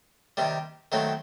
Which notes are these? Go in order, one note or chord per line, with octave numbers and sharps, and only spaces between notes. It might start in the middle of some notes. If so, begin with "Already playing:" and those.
C3 D#3 G3
D#3 F#3 A3 C4